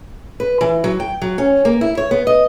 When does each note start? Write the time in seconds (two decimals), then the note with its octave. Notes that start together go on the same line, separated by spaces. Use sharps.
0.40 B4
0.61 E3
0.84 F#3
1.00 G5
1.22 F#3
1.38 C#4
1.65 A#3
1.81 E4
1.97 C#5
2.11 B3
2.27 D#5